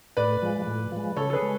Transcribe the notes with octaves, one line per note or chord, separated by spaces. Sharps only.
A2 B4 D5
F3 G#3
A2
F3 G#3
C#3 A4 C#5
A4
G#4 B4
G#3